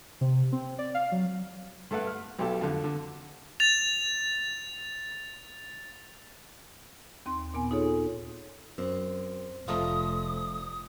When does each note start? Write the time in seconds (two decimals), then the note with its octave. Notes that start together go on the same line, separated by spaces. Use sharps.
0.21 C3
0.52 C4
0.79 D5
0.94 F5
1.12 F#3
1.91 G2 A3 A4 B4 F#5
2.07 F6
2.39 B1 G4 A4
2.61 F2 D3
2.84 D3
3.60 A6 F7
7.26 D#2 C4 C6
7.54 A#2 B3 G#5
7.71 D#4 F4 G#4 A4 C#5
8.78 F#2 C4
9.68 F1 F3 G3 A3 F4 D#5 A#5 D#6